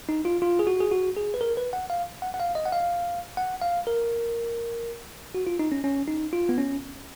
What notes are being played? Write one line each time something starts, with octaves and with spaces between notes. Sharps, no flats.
D#4
F4
F4
G#4
F#4
G#4
F#4
G#4
B4
A#4
B4
F#5
F5
F#5
F#5
F5
D#5
F#5
F5
F#5
F5
A#4
F#4
F4
D#4
C#4
C#4
D#4
F4
B3
C#4